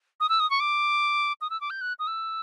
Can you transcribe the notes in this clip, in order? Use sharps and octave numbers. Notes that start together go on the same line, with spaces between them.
D#6
E6
D#6
C#6
D6
D#6
E6
D6
G6
F#6
D#6
E6